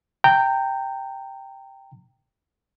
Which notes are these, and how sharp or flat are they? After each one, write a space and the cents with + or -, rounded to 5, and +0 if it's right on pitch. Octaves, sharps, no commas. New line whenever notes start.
G5 +0 A#5 -30